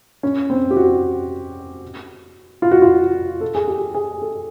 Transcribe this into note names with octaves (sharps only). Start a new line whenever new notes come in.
C#4
C4
G4
F#4
F4
F#4
F4
A4
G#4
G4
G#4
A4